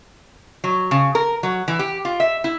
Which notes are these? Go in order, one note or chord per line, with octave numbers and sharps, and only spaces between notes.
F#3
C#3
A#4
F#3
E3
G4
F4
E5
E4